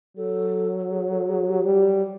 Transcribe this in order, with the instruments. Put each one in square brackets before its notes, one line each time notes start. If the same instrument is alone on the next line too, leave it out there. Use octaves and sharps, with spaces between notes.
[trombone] F#3 [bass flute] A4
[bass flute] G#4
A4
G#4
G4
[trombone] G3